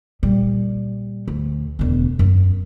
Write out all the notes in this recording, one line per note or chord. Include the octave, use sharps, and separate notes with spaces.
A#2 G3
D2
E1 D2
F#2